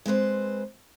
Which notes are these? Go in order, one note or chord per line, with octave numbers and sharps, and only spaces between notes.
G#3 C4 B4 C5